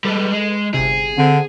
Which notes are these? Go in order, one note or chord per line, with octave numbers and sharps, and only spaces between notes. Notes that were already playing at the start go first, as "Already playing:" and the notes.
G3 G#3 A4 B4
G#3
G1 C3 G#4
D3 C4